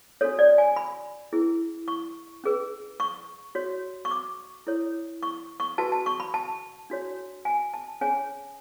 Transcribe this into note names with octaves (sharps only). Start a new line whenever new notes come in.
D4 F#4 A4 C#5
D5
G#5
B5
C#4 E4 G#4 B4
C#6
C#4 G#4 B4
C#6
F#4 C#5
C#6
D6
E4 A4 C#5
C#6
C#6
F#4 B4 A5
A5
C#6
B5
A5
D4 F#4 C#5
G#5
A5
C#4 G#4 C#5 G#5